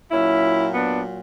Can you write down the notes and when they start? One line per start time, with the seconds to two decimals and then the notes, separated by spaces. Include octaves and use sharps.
0.11 A#2 F#3 C#4 E4
0.74 B3 D4